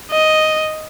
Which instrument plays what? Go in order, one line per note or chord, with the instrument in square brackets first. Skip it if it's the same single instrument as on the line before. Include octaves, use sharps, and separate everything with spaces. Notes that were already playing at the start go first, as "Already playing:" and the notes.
[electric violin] D#5